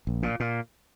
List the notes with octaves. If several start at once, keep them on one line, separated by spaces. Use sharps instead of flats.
A#1
A#2
A#2